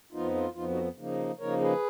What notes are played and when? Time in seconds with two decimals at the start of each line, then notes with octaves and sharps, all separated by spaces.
0.13 F2 F3 B3 D#4 F4
0.35 F4
0.55 F2 F3 B3 D#4 F4
0.69 D#4 F#4
0.97 C#3 F3 A#3 D#4
1.39 C#3 F3 A#3 D#4 A#4 C#5
1.61 G#4 B4